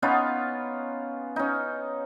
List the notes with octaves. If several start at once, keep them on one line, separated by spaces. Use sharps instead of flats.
B3 C#4 D#4 F4
C#4 D#4